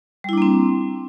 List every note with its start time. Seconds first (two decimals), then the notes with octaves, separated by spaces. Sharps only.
0.24 G3
0.29 E4
0.33 D4
0.38 A#3
0.42 C4